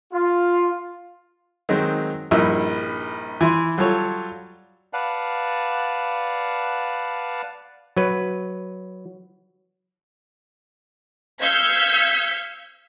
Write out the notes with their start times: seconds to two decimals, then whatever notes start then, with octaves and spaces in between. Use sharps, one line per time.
0.13 F4
1.69 D#3 F#3 G#3 C4
2.31 A#1 G2 A#3 D#4 E4 E5
3.41 E3 E4 C6
3.78 F#3 G3 F4 A4 C#5
4.93 B4 D5 F5 F#5 A5
7.97 F#3 B4
11.42 F5 E6 G6 G#6 B6 C#7